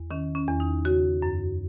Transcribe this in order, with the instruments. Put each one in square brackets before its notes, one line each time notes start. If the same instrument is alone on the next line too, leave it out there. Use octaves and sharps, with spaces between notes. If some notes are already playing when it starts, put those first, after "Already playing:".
Already playing: [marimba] E2
D#3 C#4
C#4
E2
D#4
C#3 F#4
F#2